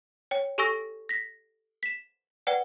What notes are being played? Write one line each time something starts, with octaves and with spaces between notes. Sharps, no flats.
C#5 G5
G4 A4 G#5 C#6 E6 A#6
A#6 B6
B6 E7
B4 D5 F#5 G5